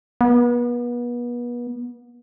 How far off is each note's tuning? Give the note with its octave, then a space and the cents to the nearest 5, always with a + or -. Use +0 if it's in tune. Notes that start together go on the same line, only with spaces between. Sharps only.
B3 -35